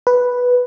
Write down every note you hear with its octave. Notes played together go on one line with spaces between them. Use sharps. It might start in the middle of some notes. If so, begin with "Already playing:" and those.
B4